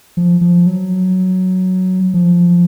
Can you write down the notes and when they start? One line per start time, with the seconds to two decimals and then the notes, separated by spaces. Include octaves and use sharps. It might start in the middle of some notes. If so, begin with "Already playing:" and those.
0.17 F3
0.41 F3
0.66 F#3
2.14 F3